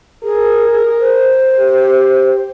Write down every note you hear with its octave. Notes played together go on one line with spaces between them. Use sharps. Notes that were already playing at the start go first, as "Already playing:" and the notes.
G#4 A#4
C5
G4